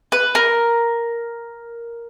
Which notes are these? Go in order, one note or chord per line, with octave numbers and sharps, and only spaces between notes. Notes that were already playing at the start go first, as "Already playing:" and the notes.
B4
A#4